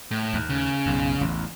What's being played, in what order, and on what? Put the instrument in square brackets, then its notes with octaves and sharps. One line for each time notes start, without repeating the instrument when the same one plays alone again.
[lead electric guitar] A2
[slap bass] D#2
[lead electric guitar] C#3
[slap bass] B1 F#2
A1 E2